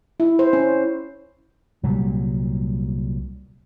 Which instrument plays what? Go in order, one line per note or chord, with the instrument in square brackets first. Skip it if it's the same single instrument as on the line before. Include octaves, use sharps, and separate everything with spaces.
[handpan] E4
C5
C#4
[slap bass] C2 A#2 F#3 G3